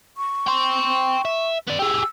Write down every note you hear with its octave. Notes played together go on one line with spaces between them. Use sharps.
C#6
G5 C6
E5
B3 D5
G4 G#4 E6